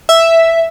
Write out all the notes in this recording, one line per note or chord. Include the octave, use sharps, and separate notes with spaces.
E5